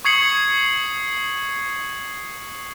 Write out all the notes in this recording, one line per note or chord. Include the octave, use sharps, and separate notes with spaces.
C#6 D#6 G#6 C7 C#7 F#7